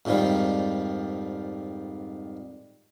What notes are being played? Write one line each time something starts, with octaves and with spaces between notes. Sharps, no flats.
F2 G#2 D#3 F3 G3